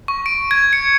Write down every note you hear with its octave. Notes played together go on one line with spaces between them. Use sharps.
C#6
D7
G#6
C#7